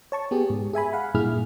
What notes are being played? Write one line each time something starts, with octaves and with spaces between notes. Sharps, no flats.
C#5 A5 C#6
B3 G4 G#4
G#2
G#4 E5 G#5 B5
F5 F#5 B5
G2 A#2 E4 G#4 F6